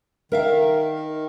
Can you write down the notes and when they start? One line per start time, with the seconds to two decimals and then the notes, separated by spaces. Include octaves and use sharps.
0.32 D#3 A#4 E5 F5